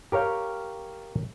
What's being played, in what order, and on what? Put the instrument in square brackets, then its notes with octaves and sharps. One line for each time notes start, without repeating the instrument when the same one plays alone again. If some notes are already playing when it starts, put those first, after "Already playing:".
[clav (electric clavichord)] G4 A#4 C#5 F5 G5